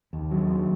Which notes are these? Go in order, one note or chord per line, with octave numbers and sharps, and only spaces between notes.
D#2
F#3
D#2